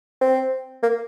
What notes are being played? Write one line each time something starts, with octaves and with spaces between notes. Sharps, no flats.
C4
A#3